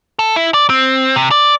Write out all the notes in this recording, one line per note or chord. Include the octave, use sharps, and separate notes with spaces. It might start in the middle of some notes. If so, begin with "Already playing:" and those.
A4
E4
D5
C4
C3
D5